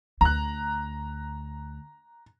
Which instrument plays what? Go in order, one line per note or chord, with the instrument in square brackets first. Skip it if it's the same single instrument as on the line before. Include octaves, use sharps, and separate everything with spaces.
[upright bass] D2 [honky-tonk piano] A#5 F#6